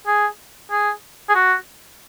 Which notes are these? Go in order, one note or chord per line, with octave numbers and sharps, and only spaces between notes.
G#4
G#4
G#4
F#4